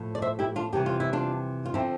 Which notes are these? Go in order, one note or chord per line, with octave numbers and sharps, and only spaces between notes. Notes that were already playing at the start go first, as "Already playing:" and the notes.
Already playing: A2 F3
D5
C5 E5
E4 G4
D4 F4
F2 C3 E3 G3 G4
F4
E4
D4 F4
F4
D3 F3 C4 E4